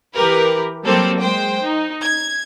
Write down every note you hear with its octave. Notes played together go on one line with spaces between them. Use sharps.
E3 G4 A#4 B4
F#3 G3 A#3 C4 A4
G#3 C5 G5
D#4
G#6